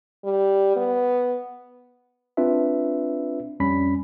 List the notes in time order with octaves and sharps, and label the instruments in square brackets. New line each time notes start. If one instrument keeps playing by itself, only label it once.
[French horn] G3
B3
[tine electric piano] C4 D4 F4 B4 E5
F2 G3 C#4 B5 B6